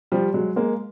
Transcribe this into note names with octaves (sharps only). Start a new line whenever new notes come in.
F3 G3
F#3 G#3
G#3 A#3